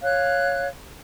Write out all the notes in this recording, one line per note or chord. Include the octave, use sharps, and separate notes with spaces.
C#5 F5 F#6